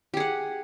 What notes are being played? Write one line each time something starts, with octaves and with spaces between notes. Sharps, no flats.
G4 G#4 F#5